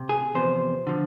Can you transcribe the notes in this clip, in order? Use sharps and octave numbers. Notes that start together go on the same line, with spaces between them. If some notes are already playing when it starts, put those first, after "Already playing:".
Already playing: C3
G#4
E2 C3 F3 C5
D3 F3